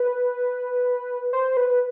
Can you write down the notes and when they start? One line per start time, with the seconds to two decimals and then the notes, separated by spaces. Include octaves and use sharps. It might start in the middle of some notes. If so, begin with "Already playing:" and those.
Already playing: B4
1.33 C5
1.57 B4